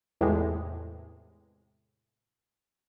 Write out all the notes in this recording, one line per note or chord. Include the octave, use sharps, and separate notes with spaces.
E2 A2 C3 G#3